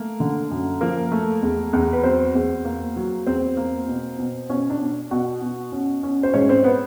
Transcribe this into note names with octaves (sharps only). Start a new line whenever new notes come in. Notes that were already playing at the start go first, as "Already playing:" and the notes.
Already playing: A3 A#3
D3
F#2
F3 A#3 A#4
A3
E2
E2
B4
F#3 C4 C5
E2
A#3
F#3
E2 C4 C5
A#3
B2
B2
B2 C#4 C#5
D4 D5
B2
B2 F#4 F#5
B2
C#4
C#4
C5
G#2 C#4 C#5
C4 C5
B3 B4